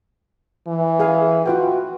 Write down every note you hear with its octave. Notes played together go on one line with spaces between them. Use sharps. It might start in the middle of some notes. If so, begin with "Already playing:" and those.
E3
G#4 F5 G#5
F4 F#4 B4 G5